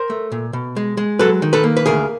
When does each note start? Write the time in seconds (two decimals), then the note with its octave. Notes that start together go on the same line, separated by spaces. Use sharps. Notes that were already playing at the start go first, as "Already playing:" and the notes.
Already playing: A#4 C5
0.10 A3
0.32 A#2
0.53 B2
0.76 G#3
0.97 G#3
1.19 F#3 A4 B4
1.42 D#3
1.53 A4 B4
1.64 A#3
1.77 B4
1.86 D2 G#4 A#4